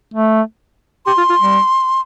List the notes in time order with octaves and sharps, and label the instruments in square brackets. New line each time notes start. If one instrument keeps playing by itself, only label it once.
[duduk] A3
[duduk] G4 [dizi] C6
[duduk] F4
F4
G3